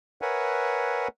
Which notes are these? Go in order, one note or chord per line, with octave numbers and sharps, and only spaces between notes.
A#4 B4 C#5 E5 F#5 G#5